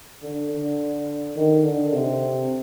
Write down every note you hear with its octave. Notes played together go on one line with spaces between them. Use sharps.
D3
D3
D#3
D3
C3